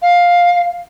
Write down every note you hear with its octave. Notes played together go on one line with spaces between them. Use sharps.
F5